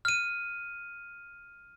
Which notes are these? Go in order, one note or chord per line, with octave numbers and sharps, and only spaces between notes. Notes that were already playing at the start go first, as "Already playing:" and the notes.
F6 D#7